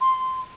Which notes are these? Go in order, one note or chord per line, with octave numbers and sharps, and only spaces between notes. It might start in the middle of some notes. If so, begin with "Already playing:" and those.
C6